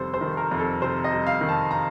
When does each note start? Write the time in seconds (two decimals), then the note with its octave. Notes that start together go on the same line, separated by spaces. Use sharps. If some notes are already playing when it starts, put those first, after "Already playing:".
Already playing: F2 C3 D#3 G3 A4 C5
0.14 C5
0.21 D#3
0.37 A#4
0.51 F2
0.59 A4
0.82 C3 C5
1.04 D#5
1.12 G3
1.27 F5
1.41 D#3
1.49 A5
1.71 A#5